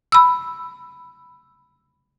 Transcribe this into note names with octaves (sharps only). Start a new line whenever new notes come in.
B5 E6